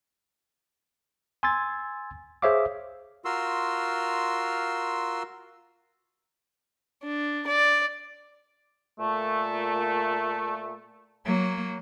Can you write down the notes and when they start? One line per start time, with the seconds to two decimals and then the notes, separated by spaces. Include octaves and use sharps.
1.43 G#5 C6 E6 G#6 A6
2.42 G#4 C5 C#5 E5 F5 D6
3.25 F4 F#4 A#4 C6 E6
7.04 D4
7.47 D5
8.99 A#2 A3
11.25 F#3 A#3